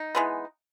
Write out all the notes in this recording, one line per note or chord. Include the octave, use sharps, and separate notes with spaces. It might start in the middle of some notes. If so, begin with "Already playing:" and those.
Already playing: D#4
E3 G#3 B3